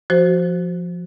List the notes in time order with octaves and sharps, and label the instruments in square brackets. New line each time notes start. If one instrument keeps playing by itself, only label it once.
[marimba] F3 F#4 C5